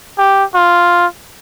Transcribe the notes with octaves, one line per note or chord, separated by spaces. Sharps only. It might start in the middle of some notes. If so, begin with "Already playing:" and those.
G4
F4